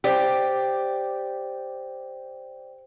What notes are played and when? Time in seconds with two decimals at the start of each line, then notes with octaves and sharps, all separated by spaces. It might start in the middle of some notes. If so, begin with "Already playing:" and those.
0.04 G4 C5 D5 G5